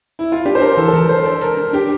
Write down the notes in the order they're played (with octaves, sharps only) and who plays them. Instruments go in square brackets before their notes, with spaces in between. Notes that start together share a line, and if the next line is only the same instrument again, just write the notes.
[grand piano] E4
F4
[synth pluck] D4 [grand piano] G4
[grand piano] C5
[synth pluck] D4 [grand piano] A#4
[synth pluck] E3 [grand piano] A4
[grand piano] A4
[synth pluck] E3 [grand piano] A#4
[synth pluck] A4 [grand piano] C5
[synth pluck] D4
[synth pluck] A4 [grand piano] A#4
[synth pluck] D4
[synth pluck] D4 [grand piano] G4